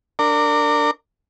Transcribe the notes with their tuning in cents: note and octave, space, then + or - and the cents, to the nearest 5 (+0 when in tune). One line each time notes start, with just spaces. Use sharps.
D4 +0 A#4 -25